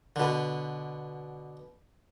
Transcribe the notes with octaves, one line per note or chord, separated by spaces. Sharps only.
B2 D3